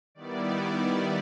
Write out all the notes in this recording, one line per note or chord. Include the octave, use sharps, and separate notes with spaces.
D#3 G3 B3 E4 D5